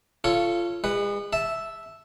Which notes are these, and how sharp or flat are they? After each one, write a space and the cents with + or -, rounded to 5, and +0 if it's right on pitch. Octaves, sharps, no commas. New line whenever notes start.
F4 -20 A4 +0 C#5 +0
G#3 -40 B4 +0
E5 +0 A5 -5